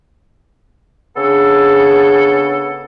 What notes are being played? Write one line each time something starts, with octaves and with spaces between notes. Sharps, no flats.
C#3 B3 D4 G#4 A4